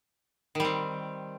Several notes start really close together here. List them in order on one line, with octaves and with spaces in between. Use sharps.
D#3 G3 C4